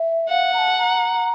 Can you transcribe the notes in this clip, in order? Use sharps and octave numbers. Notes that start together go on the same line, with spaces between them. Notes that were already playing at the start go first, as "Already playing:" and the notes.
Already playing: E5
F5 F#5
A#5
A5
A#5